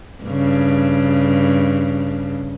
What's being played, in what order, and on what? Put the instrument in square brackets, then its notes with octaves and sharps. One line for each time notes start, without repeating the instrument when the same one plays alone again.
[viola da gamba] G2 C#3